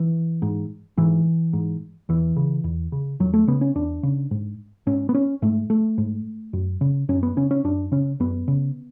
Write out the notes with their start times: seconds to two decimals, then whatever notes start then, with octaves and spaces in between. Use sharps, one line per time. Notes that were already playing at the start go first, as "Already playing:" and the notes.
Already playing: E3
0.42 G#2
0.97 G#2 E3
1.53 G#2
2.09 E2 E3
2.36 C#3
2.64 E2
2.92 C#3
3.20 E2 F#3
3.34 A3
3.48 C#3 B3
3.61 C#4
3.75 E2 D4
4.03 C#3
4.31 G#2
4.87 G#2 C#4
5.09 B3
5.15 C#4
5.42 G#2 A3
5.70 A3
5.98 G#2
6.53 F#2
6.81 C#3
7.09 F#2 C#4
7.23 B3
7.37 C#3 C#4
7.51 C#4
7.64 F#2 D4
7.92 C#3 C#4
8.20 F#2 B3
8.48 C#3